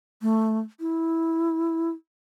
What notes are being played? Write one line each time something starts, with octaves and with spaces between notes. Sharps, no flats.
A3
E4